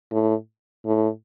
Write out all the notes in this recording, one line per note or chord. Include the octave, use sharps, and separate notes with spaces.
A2
A2